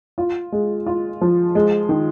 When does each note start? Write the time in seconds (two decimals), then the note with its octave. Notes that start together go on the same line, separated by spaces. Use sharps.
0.18 F4
0.52 G#3
0.86 F4
1.21 F3
1.55 G#3
1.89 D#3